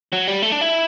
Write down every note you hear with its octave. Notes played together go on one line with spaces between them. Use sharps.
F#3
G3
A3
D4
E4